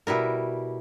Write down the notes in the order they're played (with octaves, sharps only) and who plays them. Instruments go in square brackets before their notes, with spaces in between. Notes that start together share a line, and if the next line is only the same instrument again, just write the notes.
[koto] B2 G3 E4 A#4